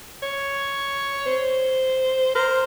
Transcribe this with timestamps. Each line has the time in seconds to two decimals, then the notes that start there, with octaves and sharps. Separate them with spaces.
0.23 C#5
1.26 C5
2.35 A#4 C5